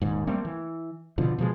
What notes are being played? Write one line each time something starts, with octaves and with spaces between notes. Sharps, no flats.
D#1 D#2 G#2
G3 A3 A#3 C4
E3
B2 D3 F3
B2 F3 F#3 G#3